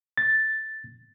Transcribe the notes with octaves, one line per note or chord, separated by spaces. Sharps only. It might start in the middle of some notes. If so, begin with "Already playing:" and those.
A6